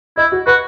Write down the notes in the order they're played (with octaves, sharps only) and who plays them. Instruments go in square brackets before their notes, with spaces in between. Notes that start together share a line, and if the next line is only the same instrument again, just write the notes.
[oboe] E4 [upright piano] D#5
[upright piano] F#4
[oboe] F#4 [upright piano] B4